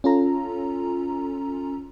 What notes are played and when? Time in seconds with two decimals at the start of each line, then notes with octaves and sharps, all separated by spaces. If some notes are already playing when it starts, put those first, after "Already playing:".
0.04 C#4 F4 A4 A#5